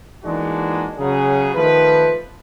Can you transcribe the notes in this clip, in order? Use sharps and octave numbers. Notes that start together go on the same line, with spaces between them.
E3 G#3 A#3 D4 D#4 F#4
C#3 F#3 G#4
D#3 F3 A3 B4